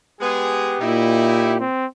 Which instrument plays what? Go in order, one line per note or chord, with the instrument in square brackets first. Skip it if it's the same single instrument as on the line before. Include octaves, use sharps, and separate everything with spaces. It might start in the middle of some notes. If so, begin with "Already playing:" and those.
[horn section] G#3 B3 G#4 [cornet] G4
[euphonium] A#2 [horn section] D#4 E4
[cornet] C4